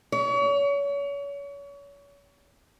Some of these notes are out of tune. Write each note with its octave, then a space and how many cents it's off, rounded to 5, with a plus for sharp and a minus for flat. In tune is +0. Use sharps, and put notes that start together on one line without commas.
C#5 +35